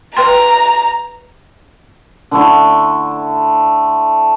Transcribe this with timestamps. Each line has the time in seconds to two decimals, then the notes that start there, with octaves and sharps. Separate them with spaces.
0.17 B4 G5 A#5 C6
2.31 D3 A3 E4